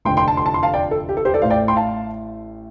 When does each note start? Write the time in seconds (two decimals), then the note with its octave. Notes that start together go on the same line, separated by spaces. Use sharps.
0.05 F1 F2 D3 G5 C6
0.17 G5 C6
0.28 A5
0.37 C6
0.46 A5
0.54 C6
0.63 F5 A5
0.74 D5 G5
0.91 A4
1.09 G4
1.17 A4
1.25 G4 C5
1.34 A4 D5
1.42 A1 A2 C5 F5
1.50 D5 G5
1.68 G5 C6
1.76 F5 A5